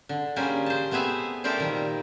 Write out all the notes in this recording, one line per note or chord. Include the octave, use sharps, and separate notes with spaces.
D3
G3 A#3 C#4 G#4 C5
C5 A5
A3 B3 C4 G#4 E5 G#5
A3 G4 A4 A#4 C5 D5
A#2 D#3 G3